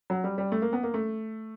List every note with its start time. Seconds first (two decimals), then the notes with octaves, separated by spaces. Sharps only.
0.10 F#3
0.24 G3
0.38 G3
0.52 A3
0.62 A#3
0.73 B3
0.83 A#3
0.94 A3